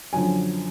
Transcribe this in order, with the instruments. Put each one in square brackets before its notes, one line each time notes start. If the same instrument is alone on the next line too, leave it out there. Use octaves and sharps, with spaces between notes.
[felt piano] F#2 D3 F3 G#5